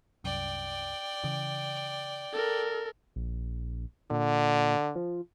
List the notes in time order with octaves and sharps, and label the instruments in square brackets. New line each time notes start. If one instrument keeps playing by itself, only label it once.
[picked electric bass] C2 F#2 [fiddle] D5 G5
[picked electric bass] C#3 E3
[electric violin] A4 A#4
[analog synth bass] A#1
[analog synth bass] A#2 [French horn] D3
[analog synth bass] F3